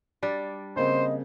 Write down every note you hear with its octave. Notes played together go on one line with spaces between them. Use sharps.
G3 D4
C#3 A#3 C4 C5 D#5